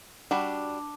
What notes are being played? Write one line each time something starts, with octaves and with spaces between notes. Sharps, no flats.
G3 D4 F#4 B5